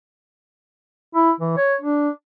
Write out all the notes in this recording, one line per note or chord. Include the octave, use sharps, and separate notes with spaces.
E4
E3
C#5
D4